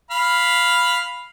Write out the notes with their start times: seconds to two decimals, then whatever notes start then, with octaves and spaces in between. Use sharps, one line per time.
0.11 F5 B5